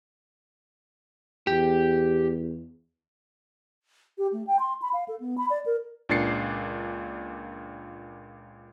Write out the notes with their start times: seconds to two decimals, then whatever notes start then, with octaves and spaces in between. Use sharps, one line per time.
1.47 E2 G4
4.18 G4
4.33 A3
4.47 G5
4.59 C6
4.82 B5
4.93 F5
5.08 A4
5.20 B3
5.38 B5
5.50 D5
5.66 A#4
6.09 C#2 A#2 D4 A6 C7 C#7